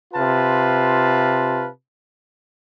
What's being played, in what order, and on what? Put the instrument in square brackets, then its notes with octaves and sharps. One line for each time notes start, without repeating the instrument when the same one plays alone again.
[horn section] C3 F4 B4 F5 A5